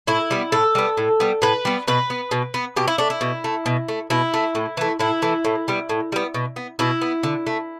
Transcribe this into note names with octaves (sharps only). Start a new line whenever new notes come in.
A2 E4
G3 B3
A2 A4
G3 B3
A2
G3 B3
A2 B4
G3 B3
B2 B4
B3
B2
B3
B2 G4
E4
A3 D4
E4
B2
A3
B2
A3
B2 E4
A3
A2
E3 A3
A2 E4
E3 A3
A2
G3 B3
A2
G3 B3
B2
B3
B2 E4
B3
D3
A3